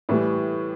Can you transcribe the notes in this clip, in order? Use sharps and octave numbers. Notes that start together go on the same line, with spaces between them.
A2 E3 G3